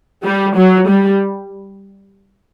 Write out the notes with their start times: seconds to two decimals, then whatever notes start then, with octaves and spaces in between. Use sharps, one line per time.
0.24 G3
0.57 F#3
0.88 G3